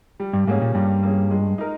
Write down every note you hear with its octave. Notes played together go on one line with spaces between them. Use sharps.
G3
G2
G#2 A#3 C#4 G#4
A#2
G2 G3
A#3 C#4 G#4
G#3
D#4 A#4